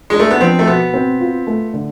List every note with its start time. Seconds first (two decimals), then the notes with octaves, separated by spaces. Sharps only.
0.10 G#3 D4
0.20 A3
0.30 B3
0.41 F3 C4
0.59 A3
0.67 B2 B3
0.94 C4
1.21 F4
1.47 A3
1.74 D3